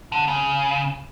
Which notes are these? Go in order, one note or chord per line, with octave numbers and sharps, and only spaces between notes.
D3
C#3